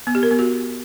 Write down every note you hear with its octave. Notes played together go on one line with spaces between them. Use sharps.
B3
G4
A#4
B3
F#4